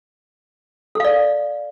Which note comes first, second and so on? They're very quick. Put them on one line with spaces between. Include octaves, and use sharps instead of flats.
A4 F5 D5